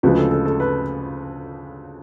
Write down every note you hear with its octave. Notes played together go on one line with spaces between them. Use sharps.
D2 C#3 F3 G#3 B4
A4
A4
A4
B4